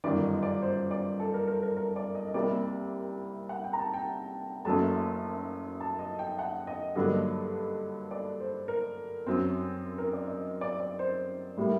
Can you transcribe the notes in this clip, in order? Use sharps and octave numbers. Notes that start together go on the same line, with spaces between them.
G1 F#2 D#3 D5
D#5
D5
C5
D5
A4
A#4
A#4
A#4
A#4
D5
D#5
D#5
C2 C3 G3 A#3 D5
F#5
G5
A#5
A5
G5
F#1 F#2 F#3 A3 A5
A5
D#5
G5
F#5
D#5
G2 D3 F#3 A#3 D4 D#5
D5
C5
A#4
F#2 F#3 C4
A#4
D5
D#5
D5
D5
C5
A2 G3 A#3